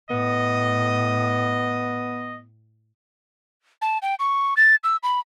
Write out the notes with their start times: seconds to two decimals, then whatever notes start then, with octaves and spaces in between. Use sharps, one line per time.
0.10 A2 B3 D#5
3.82 A5
4.02 G5
4.20 C#6
4.57 A6
4.84 E6
5.03 B5